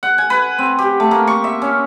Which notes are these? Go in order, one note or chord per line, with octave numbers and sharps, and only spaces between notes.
F#5
G#5
B4
C4
G4
A3
A#3
C#6
E5
C#4